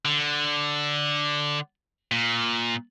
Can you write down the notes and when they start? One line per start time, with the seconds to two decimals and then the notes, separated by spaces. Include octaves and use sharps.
0.05 D3
2.12 A#2